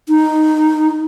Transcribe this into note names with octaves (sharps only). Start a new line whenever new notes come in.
D#4